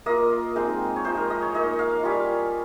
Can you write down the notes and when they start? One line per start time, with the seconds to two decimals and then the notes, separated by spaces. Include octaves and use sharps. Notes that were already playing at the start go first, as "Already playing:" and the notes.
0.06 A#3 F4 D#5
0.56 G#3 C4 D#4
0.96 C#5
1.05 F3 G#3 D#4 C5
1.17 A#4
1.30 D#5
1.42 C#5
1.54 A#3 D#4 D#5
1.79 F5
2.03 G3 C#4 F4